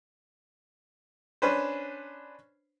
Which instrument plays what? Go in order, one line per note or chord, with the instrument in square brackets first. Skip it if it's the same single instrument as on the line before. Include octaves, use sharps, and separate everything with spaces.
[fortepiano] C#4 D4 B4 C5